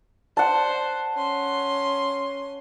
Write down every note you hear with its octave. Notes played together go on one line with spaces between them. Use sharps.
C5 F#5 A5
C#4 C6